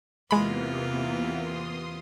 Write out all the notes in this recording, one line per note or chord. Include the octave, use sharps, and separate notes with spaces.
E2 C3 E3 G#3 A#3 B3 F4 B5
C6 D#6